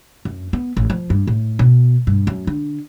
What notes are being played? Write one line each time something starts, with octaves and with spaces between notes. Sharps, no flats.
F#2
B3
A1
F3
G2
A2
B2
G2
F#2
D3